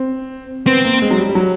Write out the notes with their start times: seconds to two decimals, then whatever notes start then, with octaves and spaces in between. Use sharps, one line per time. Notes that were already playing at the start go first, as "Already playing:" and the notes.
Already playing: C4
0.67 B3 C4
0.85 A#3
1.02 G#3
1.11 F#3
1.18 G3
1.29 G3
1.35 F#3